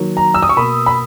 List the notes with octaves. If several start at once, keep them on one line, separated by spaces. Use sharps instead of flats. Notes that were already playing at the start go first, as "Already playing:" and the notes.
Already playing: D#3 F#3 A#3
A#5
E6
D#6
C#6
B2 A#3 B5
B5